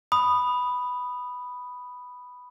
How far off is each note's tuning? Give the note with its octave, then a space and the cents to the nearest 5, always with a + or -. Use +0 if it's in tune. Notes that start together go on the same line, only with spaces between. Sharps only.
B5 +0 D#6 -10